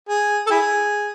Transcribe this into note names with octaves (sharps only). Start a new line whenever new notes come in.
G#4
A4
E4 G#4